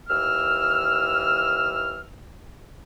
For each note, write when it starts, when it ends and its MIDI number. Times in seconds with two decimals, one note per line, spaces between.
0.08 2.02 39
0.08 2.02 52
0.08 2.02 88
0.08 2.02 89